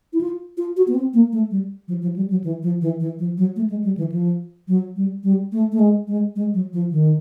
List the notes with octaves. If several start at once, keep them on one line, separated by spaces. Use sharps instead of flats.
E4
F4
F4
F#4
B3
C4
A#3
A3
G3
F3
F3
G3
F#3
E3
F3
E3
E3
F3
F#3
A3
G#3
G3
E3
F3
F#3
G3
G3
A3
A3
G#3
G#3
G#3
F#3
F3
D#3